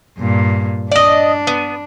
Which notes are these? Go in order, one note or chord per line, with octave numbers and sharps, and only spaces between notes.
G2 A#2
D4 D5 D#5
B3